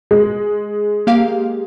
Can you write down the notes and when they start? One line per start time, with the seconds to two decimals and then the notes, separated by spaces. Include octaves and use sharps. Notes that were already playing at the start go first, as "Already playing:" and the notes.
0.11 G#3
1.07 A#3 G4 F5